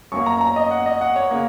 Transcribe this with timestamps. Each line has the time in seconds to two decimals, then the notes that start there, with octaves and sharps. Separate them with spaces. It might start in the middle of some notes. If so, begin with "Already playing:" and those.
0.12 F#2 F#3 A#3 C#6
0.26 A#5
0.41 A#5
0.56 D#5
0.71 F#5
0.86 D#5
1.01 F#5
1.16 C#5
1.31 C#3 A#3